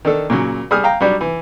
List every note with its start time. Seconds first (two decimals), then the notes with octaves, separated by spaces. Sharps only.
0.05 D#3 D4 A4
0.30 A#2 C#3 F#3
0.71 G3 G#4 D#6 F6
0.84 F5 G5 A#5
1.01 F#3 G3 D4
1.21 E3